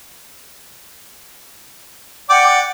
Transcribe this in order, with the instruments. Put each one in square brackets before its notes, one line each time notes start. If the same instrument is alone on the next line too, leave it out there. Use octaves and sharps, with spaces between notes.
[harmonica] D5 G5 D6 [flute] F#5